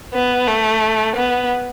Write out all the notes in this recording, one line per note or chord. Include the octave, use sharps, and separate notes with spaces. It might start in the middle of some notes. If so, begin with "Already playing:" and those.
B3
A3
B3